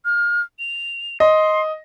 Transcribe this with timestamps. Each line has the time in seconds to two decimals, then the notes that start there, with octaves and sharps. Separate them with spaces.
0.05 F6
0.59 F7
1.20 D#5 C6